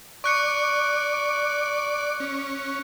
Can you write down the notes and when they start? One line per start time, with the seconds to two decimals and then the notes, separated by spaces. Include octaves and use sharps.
0.24 D5 C#6 F#6 C#7
2.20 C#4